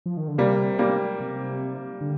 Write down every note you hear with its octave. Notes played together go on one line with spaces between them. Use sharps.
F3
D#3
D3
C3 G3 A#3
G3 A#3
C3
D3